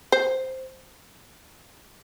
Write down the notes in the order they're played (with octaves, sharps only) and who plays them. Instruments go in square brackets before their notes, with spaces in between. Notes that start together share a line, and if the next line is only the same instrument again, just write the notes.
[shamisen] C5